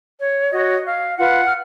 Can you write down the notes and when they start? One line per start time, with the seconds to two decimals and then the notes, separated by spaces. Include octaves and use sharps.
0.19 C#5
0.52 F#4 C#5 D#5
0.85 F5
1.17 F4 B4 F#5
1.46 F6